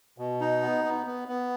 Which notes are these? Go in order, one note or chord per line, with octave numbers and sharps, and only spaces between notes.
B2
D#4
B3
B3
B3
B3